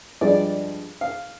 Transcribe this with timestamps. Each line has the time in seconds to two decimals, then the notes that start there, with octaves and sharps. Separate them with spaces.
0.21 G2 F3 G#3 D5
1.01 F5